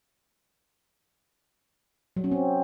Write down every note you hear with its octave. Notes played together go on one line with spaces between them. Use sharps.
F#3
C#4
C4